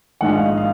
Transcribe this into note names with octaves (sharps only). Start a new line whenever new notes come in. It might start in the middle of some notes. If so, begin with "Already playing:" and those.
A#1 G#2 D#3 F#5
F5
D#5
F5